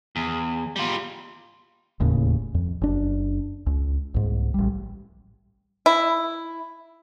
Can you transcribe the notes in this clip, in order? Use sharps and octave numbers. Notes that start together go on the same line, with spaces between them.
E2
G3 F4
E1 D#2 A2 C#3
F2
F#1 D4
C#2
C2 G#2
A1 G3
E4